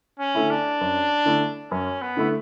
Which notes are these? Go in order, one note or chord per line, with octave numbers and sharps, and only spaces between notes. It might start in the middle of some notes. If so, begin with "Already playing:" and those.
C#4
D3 A3 E4
D4
F#2
D3 A3 E4
F#2 C#4
B3
D3 A3 E4